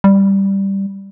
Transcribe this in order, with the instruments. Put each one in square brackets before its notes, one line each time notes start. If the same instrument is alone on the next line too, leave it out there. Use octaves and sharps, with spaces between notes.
[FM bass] G3